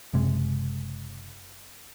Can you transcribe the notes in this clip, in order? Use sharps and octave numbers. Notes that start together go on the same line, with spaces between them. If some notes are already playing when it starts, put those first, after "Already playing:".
F#1 C3 G#3